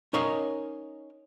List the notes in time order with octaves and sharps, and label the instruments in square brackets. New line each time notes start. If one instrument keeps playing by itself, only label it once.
[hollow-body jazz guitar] C#4 D#4 A#4 C#5 D#5 F5